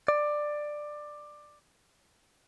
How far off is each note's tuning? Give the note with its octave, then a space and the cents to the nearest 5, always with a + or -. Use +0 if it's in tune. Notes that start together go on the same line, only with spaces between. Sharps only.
D5 +15